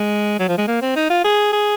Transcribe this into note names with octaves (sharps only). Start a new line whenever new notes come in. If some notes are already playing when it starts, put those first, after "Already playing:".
Already playing: G#3
F#3
F3
G#3
A#3
C4
D#4
F4
G#4
G#4